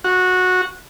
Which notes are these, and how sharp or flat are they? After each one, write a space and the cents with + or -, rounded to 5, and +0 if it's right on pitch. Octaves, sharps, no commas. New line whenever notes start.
F#4 -15